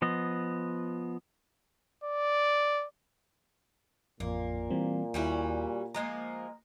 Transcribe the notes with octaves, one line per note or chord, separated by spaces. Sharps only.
F3 B3 D#5
D5
A1 F2 A#2 A#3
E3 G3 C4
D#2 G3 C#4 E4 F#4
F3 G#3 A#3 A#5